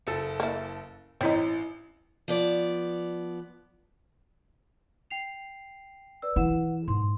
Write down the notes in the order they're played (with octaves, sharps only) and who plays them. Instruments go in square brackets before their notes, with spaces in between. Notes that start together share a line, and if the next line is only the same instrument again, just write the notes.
[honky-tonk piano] F#1 A4
[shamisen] A#3 E4
[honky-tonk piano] A1 [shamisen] C4 D#4 [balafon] E4 C#5
[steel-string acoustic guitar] F3 B3 D5
[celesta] G5 C7 F7
B4 D5 E6
[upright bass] E3 E4 [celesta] B4 F#5 E7
[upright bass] G#2 [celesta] C6